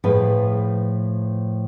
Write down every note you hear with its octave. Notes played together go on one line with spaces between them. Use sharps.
A2 F3 G#4 B4